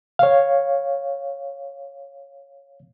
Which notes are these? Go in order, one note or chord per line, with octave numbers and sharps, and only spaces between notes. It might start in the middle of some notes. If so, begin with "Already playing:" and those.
C#5 F5